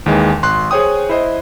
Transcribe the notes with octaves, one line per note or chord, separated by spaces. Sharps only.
D#2 D#3 E3 G#3
G#1 C6 F#6
G#4 C5 C#5 G5 D#6
E4 C5 D#5